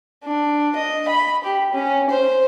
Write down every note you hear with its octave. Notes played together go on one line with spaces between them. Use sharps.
D4
D#5
B5
G4
C#4
C5